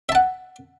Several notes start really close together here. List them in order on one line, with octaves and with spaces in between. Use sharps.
E5 A5 F#5